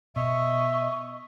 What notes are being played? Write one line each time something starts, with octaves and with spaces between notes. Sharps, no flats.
B2 D#5 E5 C#6